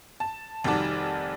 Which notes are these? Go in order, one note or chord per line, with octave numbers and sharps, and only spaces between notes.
A5
F1 D#3 G3 F#4 D5 A5